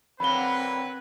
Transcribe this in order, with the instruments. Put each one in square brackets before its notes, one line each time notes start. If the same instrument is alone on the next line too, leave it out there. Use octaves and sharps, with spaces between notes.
[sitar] D3 F#3 A#3 [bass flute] C4 [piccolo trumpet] B4 [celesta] B5 G7